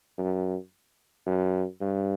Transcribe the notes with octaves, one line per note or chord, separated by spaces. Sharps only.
F#2
F#2
G2